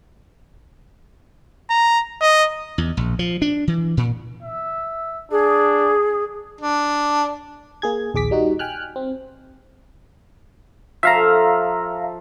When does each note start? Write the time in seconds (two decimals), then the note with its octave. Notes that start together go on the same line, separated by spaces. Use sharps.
1.70 A#5
2.21 D#5
2.78 E2
2.97 A#1
3.19 F3
3.42 D4
3.68 E3
3.97 A#2
4.43 E5
5.31 D4 G#4
6.61 D4
7.82 A#3 G#4 G#6
8.14 A#1 D#2 G#4 D6 B6
8.31 G3 D#4 F#4
8.59 G5 G#5 F6 F#6
8.96 C4
11.03 F3 A4 E5 F5 A#5